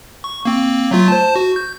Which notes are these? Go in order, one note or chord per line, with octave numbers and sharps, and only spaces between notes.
C#6
A#3 C4
F#3 A3 F4
C5 A5
F#4
G6